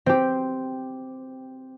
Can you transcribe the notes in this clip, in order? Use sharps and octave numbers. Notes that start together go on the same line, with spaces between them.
C4 G4